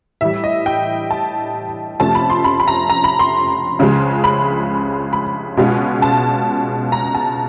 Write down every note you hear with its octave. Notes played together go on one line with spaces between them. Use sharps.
A2 E3 G3 E5
D#5
G5
A5
F2 C3 F3 A3 C#4 A5
B5
C6
B5
B5
A#5
A#5
B5
C6
C#2 C#3 F3 G#3
B5
B5
B2 G#3 C#4 F4
A5
A#5
A5